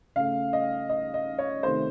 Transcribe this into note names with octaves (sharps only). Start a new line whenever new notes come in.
C#3 A3 F5
D#5
D#5
D#5
C#5
C3 D#3 A3 C5